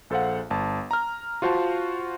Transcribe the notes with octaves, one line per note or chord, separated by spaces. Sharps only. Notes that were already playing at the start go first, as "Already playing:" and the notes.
A#1 A4 C5 F5 F#5
G1 A5
A#5 F6
F4 F#4 C5 F5 A5